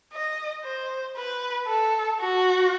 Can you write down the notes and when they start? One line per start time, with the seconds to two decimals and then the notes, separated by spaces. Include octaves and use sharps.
0.12 D#5
0.64 C5
1.17 B4
1.67 A4
2.20 F#4